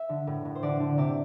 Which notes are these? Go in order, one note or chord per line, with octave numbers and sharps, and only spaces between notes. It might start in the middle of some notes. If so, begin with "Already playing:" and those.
Already playing: E5
D3
A2
A2
C5
D3 D5
D3
C3 D5